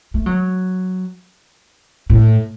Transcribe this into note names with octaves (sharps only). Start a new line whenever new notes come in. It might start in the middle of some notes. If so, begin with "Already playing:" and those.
A3
F#3
A2